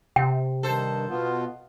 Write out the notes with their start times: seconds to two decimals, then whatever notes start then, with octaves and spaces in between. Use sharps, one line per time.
0.16 C3 G5
0.63 G2 D#3 A4 C5
1.09 B2 B3 F4